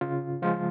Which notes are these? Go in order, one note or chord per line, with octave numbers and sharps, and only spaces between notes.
C#3 F4
F3 G#3 F4